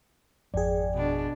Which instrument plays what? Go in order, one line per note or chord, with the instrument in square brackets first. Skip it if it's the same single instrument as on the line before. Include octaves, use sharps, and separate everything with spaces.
[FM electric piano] G#1 G#4 [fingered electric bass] F2 [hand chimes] D5 G5
[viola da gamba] B2 D4